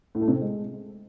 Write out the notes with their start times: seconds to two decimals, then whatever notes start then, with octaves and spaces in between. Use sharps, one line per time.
0.15 A2
0.21 A3
0.28 C3
0.34 C4
0.41 G#3